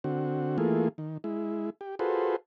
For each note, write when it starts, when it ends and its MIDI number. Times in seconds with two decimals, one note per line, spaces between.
0.04 0.57 50
0.04 0.57 60
0.04 0.57 66
0.58 0.88 52
0.58 0.88 57
0.58 0.88 58
0.58 0.88 65
0.58 0.88 68
0.98 1.18 51
1.24 1.70 56
1.24 1.70 64
1.81 1.95 67
1.99 2.36 65
1.99 2.36 66
1.99 2.36 68
1.99 2.36 69
1.99 2.36 71
1.99 2.36 72